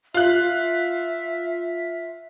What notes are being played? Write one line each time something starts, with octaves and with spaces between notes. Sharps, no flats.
F4 E5 F#6